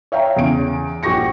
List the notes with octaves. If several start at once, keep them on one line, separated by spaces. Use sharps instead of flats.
C#5 E5 F5 G5 A#5
E2 C#3 D7
A#1 F#4 G4 C#6 A#6 C#7